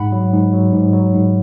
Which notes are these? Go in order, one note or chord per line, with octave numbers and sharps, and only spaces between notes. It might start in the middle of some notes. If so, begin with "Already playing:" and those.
Already playing: G#2 F#5 B5
F#3
G#2
F#3
G#2
F#3
G#2